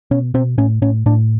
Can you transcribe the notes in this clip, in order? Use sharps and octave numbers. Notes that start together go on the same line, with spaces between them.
B2 C#4
B2 C4
A2 C#4
A2 C#4
A2 D4